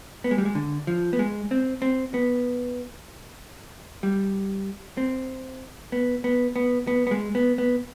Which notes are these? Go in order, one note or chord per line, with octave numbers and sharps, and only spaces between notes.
B3
G#3
G3
G#3
D3
F3
B3
G#3
C4
C4
B3
G3
C4
B3
B3
B3
B3
B3
G#3
B3
B3